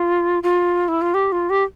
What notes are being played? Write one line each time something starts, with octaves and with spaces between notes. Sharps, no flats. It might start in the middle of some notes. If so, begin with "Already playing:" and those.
Already playing: F4
F4
E4
F4
G4
F4
G4